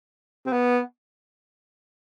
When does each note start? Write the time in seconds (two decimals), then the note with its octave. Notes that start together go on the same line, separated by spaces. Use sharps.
0.46 C4
0.52 B3